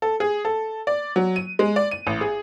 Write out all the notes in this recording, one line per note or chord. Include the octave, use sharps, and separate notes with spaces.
A4
G#4
A4
D5
F#3
D#7
G#3
D5
D#7
A1
G#4